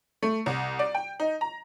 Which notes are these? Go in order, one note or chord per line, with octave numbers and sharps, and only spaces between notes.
A3
C2
D5
G5
D#4
A#5